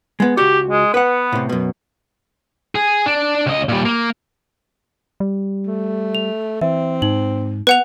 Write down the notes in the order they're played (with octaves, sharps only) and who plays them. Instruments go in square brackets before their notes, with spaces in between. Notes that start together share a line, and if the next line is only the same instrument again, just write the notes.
[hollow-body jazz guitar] G#3 B3
[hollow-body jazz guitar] C#2 F#4 [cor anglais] G4
[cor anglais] G#3
[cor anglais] B3 [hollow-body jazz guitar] B4 F#5
[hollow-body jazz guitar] A2 C3
F#2 B2
[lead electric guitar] G#4
D4
C#2 D#5
A#2 G3
A#3
[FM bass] G3
[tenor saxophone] A3
[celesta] F7
[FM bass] E3 [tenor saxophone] C4 [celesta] E5
[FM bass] G#2 [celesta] D#4 F#7
[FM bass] B3 [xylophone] B4 F#5 F7